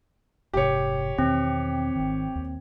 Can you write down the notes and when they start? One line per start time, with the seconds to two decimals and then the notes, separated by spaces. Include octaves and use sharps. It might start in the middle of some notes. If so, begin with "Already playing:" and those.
0.53 F1 G#2 C3 G4 C#5
1.18 E2 B2 D#3 C4
1.96 G#1 D#3
2.35 D#2